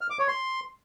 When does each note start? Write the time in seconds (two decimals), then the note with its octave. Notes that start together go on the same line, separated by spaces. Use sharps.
0.01 F6
0.10 D6
0.19 C#5
0.28 C6